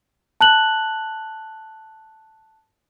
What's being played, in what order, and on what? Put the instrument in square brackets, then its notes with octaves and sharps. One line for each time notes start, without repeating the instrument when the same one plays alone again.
[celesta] A5 F#6 F#7